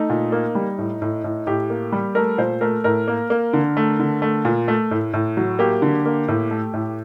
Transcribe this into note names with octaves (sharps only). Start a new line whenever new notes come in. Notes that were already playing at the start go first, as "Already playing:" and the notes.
Already playing: A3 D#4
A#2
A#3
G3
A2
A2
A2
A2 G4
A#3
G3
A3 A#4
A#2 C5
A3 A#4
A2 A#4
A#3
A#3
D3
A3
D3
A3
A#2
A3
A2
A2
F#3
A#3 G4
D3
A#3
A2
A3
A2